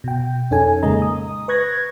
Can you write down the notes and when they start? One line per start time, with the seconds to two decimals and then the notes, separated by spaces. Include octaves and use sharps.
0.04 B2 G5
0.51 F2 C#4 D#4 A4 G#5
0.83 A#2 C#3 G#3 A#3 D#5 A#5
1.02 D#6
1.48 B4 C#6 F#6 G#6 A#6